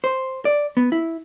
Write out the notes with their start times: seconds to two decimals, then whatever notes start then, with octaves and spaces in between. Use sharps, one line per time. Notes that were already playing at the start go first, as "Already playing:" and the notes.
0.04 C5
0.45 D5
0.77 B3
0.92 E4